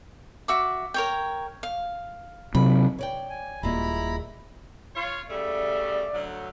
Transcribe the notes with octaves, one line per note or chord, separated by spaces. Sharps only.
F#4 E5 D6
A#4 C#5 G5
F5
C3 F#3 B5
C#5 D5 G5
G#5
D#1 A#2 G3 G#3 E4 A#5 B5
F4 C#5
C#3 G3 A3 D5
D2 F#3